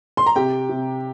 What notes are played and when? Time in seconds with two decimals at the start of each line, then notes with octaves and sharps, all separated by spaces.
0.17 C6
0.26 A#5
0.36 C3 G4 G5
0.69 C3